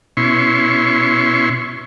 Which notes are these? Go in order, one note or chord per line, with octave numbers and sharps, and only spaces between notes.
B2 C#4 E4 C6 C#6